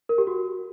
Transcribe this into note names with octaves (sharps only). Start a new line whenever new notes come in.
A#4
G4
F#4